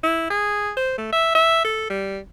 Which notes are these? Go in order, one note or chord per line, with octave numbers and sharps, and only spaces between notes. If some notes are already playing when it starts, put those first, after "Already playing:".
E4
G#4
C5
A3
E5
E5
A4
G3